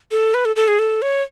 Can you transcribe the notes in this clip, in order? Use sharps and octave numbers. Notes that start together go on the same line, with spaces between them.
A4
B4
A4
A4
G#4
A4
C#5